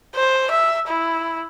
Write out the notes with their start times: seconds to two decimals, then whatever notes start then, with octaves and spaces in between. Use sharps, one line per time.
0.15 C5
0.51 E5
0.88 E4